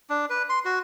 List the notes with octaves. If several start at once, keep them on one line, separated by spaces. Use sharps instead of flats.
D4
B4
C6
F#4